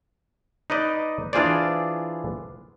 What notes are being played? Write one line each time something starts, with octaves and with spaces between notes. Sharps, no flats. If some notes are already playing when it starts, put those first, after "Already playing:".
D#4 B4 D5 D#5
E3 D4 F4 G#4 C5 D5